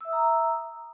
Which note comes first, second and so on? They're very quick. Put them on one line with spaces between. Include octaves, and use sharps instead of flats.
E6 E5 D#6 A#5